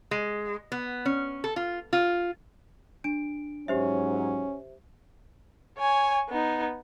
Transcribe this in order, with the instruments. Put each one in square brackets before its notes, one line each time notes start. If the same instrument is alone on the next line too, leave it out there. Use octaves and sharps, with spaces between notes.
[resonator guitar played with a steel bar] G#3
B3
C#4
A4
F4
F4
[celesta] D4 D7
[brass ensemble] G#2 F#3 [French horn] C#4 [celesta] G4 C5 E5
[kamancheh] C#5 G#5
B3 D#4